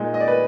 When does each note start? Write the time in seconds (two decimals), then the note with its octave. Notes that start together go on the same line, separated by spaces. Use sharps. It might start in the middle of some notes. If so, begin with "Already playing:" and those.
Already playing: A#2 G#3 D#4
0.14 D#5
0.20 D5
0.28 B4